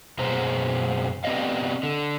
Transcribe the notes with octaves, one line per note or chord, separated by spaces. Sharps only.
F#2 B2 F#3 G#4 C5 A#5
B3 C4 G4 D5 D#5 F5
D3